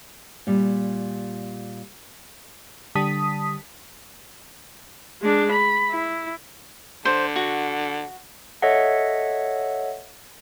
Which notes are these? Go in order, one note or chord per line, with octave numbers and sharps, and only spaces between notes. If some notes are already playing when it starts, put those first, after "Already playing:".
A#2 G3
D3 G3 A5 D#6 B6
G#3 D4
B5
E4
D3 C5
F#4
A4 C#5 D#5 E5 F#5